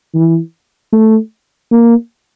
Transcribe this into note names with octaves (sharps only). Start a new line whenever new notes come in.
E3
A3
A#3